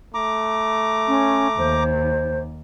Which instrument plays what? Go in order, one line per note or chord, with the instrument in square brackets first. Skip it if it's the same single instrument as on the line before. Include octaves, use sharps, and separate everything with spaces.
[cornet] A3 [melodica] A#5 D6
[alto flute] C#4
[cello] D#2 [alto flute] C5